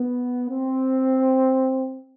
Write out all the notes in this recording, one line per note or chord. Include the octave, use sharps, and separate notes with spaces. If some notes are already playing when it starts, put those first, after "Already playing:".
Already playing: B3
C4